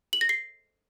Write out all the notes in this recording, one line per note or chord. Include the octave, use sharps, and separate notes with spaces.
F#7
A#6
C7